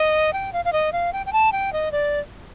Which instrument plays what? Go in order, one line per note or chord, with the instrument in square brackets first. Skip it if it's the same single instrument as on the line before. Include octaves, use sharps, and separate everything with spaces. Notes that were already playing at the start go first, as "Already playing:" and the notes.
Already playing: [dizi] D#5
G5
F5
F5
D#5
F5
G5
G5
A5
G5
D#5
D5